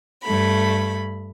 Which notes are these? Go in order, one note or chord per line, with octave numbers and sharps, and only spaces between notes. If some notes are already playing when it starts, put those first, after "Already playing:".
G2 A3 B5